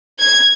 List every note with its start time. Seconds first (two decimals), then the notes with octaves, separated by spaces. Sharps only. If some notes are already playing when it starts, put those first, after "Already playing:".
0.20 G#6